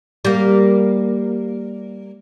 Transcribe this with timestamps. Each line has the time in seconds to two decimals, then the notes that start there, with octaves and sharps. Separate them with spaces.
0.25 G3 A#3